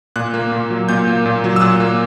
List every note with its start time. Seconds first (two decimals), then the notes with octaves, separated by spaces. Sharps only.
0.16 A#2 F#6
0.34 A#3
0.52 A#2
0.70 F#3
0.89 A#2 G6
1.08 A#3
1.26 A#2
1.44 F#3
1.56 E6
1.61 A#2 F#6
1.80 A#3